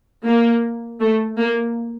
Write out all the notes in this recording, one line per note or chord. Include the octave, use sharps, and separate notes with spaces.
A#3
A3
A#3